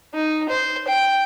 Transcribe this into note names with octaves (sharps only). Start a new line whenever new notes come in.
D#4
C5
G5